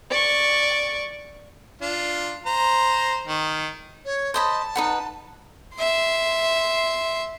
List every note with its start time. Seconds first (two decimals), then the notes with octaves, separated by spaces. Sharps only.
0.10 D5 C#6
1.81 D4 F4
2.46 C5 A#5
3.27 D#3
4.05 C#5
4.34 C5 D#5 A5 B5
4.76 D#4 B4 F#5
5.74 E5 C6